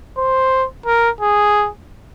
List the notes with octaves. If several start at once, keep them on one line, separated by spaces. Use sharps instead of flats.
C5
A#4
G#4